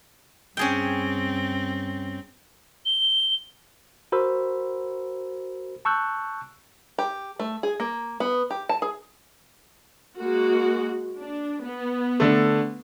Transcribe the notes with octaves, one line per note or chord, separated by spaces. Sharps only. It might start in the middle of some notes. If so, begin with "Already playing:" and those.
G2 C4 C#4 G#4 G5
G7
F#4 A#4 C5 B5 E6
A5 C#6 E6 F#6 G6
G4
A3
G#4
A#3
B3
G4
A5
G#4
G#3 A#3 F#4
D4
B3
D3 A3